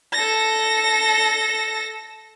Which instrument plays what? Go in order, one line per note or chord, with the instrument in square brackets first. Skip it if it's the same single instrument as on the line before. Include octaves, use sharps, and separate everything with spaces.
[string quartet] A4 A#6